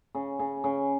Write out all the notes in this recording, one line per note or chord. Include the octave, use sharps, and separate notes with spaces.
C#3
C#3
C#3